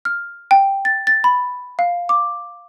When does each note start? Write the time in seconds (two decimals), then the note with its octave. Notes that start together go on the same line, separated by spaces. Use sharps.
0.05 F6
0.51 G5
0.85 A6
1.07 A6
1.24 B5
1.79 F5
2.09 D6